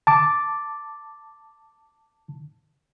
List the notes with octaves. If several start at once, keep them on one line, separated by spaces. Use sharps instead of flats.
A5 D6